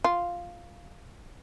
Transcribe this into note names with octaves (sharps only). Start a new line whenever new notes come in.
F4